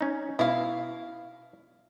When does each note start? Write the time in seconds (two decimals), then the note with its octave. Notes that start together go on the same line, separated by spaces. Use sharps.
0.01 C#4 D#4
0.39 B2 E4 F5